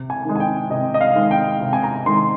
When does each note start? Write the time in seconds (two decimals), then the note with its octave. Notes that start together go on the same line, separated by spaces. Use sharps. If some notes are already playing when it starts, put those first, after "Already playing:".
Already playing: C3
0.10 G#5
0.25 D#3 G#3
0.35 G#5
0.40 G5
0.70 C3 D#5
0.94 D#5
1.01 F5
1.15 D#3 G#3
1.31 G5
1.61 C3
1.73 G#5
1.83 A#5
2.06 D#3 G#3 C6